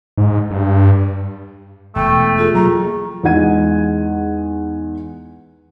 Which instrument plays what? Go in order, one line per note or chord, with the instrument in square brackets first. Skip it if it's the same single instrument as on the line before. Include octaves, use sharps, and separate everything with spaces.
[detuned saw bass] G#2
G2
[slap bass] E1 [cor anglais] A3 [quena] G5
[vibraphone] F4 G#4 [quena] A4
[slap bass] F#3 A#3 [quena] A#5
[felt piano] E2 G#3 D#4 F#5 G#6 D#7